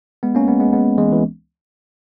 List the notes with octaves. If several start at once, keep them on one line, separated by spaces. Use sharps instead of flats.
G#3 B3
A#3 C#4
G#3 B3
G#3 B3
G#3 B3
E3 G#3
E3